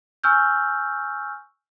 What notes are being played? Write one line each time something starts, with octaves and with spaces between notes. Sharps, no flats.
G#5 C#6 E6 F6 G6